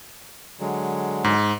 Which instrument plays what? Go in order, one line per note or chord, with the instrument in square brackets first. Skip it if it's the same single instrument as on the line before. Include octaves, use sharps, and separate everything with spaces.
[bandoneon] D3 F#3 G#3
[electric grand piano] G#2